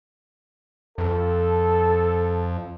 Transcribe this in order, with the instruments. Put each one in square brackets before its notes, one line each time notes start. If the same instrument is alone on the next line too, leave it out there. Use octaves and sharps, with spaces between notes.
[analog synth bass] F2 [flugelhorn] A4